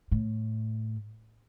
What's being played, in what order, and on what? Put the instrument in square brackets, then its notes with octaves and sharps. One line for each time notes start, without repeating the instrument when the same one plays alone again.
[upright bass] A2